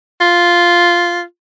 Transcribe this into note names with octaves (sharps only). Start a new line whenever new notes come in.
F4